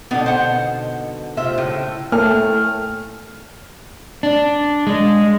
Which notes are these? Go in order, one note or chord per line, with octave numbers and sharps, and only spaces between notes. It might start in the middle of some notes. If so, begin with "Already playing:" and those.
B2 D3 B3 D4 D#4
C5 F#5
C3 F4 E5
A2 C#3
A2 A3 A#3 A4 G5 G#5 F6
D4
G#3